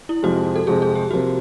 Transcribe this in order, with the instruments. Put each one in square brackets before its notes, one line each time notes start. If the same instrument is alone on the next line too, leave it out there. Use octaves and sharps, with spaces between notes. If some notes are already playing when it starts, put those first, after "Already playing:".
[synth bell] E4
[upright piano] F2 C3 F3 G#3 [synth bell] F#4
[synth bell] A4
[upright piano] F2 C3 F3 G#3 [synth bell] G#4
[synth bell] G#4
G4
[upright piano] C3 F3 A#3 [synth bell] F#4